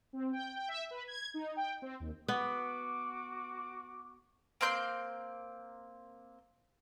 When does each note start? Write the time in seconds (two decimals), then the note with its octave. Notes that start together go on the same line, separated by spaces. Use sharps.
0.13 C4
0.32 G5
0.56 G5
0.68 E5
0.91 B4
1.07 G#6
1.34 D#4
1.56 G5
1.82 C4
2.00 D#2
2.28 B3 F#4 D6
4.61 A#3 C4 C6 G6